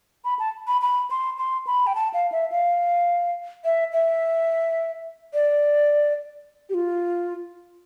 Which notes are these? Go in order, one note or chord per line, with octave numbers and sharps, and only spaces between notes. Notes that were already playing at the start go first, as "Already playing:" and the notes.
B5
A5
B5
B5
C6
C6
B5
G5
A5
F5
E5
F5
E5
E5
D5
G4
F4